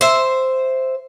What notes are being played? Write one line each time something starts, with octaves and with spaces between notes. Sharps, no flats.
C5 E5